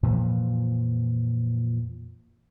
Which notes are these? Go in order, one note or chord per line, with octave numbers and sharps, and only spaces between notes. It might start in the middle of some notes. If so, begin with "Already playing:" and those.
F2 A#2 E3 F3